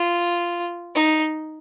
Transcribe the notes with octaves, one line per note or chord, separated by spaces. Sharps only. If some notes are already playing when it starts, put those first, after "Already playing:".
Already playing: F4
D#4